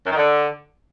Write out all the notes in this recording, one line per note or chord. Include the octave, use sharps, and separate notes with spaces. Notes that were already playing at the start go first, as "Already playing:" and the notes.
F#2
D#3
D3